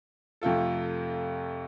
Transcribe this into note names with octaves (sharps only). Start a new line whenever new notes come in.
F2 C3 A3 F4 A4